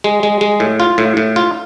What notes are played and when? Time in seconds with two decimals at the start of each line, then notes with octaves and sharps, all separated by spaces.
0.04 G#3
0.23 G#3
0.41 G#3
0.60 A2
0.80 F4
0.98 A2
1.17 A2
1.36 F4